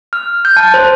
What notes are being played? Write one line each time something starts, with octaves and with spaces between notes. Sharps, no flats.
F6
G6
A5
C5